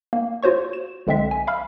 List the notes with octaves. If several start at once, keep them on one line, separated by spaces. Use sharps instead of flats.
A#3
F4 F#4 C5 C#5 C#6
E7
B1 D3 G#3 C4 E5 B6
G#5
E5 F5 B5 E6 F6